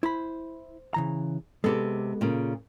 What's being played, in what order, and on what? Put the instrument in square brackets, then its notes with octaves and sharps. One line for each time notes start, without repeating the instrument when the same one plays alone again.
[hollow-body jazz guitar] E4 B5 [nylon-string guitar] C5
[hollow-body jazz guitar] C#3 E3 A#5
[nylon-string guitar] C3 A4 [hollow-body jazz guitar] G#3 B3 G4
[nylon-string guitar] A#2 C#3